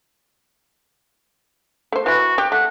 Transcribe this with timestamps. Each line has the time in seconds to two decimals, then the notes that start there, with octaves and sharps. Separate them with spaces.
1.92 A3 C5
2.06 E3 E4 F#4
2.38 G4
2.52 A3 F#5